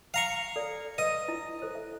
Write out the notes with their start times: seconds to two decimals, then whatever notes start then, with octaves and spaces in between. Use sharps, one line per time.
0.14 F5 A#5 C#6
0.56 A4 D5
0.98 B4 D#5
1.28 E4
1.62 A4 C5
1.75 E5